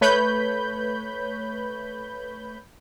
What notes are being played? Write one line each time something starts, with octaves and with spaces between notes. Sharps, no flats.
A3 B4 C#5 B5 G6